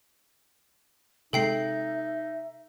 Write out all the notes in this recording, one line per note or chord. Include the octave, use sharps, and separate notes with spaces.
C3 G#3 D#4 A4 E5 G5 C7